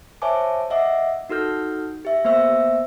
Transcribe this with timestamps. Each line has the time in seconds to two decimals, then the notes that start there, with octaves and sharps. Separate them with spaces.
0.22 C5 C#5 E5 G#5 A5 D6
0.70 D#5 E5 F#5 D6
1.30 D#4 F#4 A4 F6 G6
2.05 G4 E5
2.25 A#3 B3 C5 E5 E6